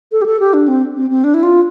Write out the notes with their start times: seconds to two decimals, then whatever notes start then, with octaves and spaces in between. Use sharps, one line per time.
0.12 A4
0.22 G4
0.26 A4
0.40 G4
0.54 D4
0.68 C4
0.96 C4
1.10 C4
1.24 D4
1.34 E4
1.43 F4